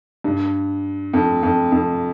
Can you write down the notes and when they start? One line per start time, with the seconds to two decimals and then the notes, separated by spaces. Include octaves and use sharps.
0.24 G2
1.13 F2
1.43 F2
1.72 F2